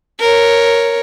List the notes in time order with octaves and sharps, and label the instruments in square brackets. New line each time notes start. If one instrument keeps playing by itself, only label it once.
[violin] A#4 C#5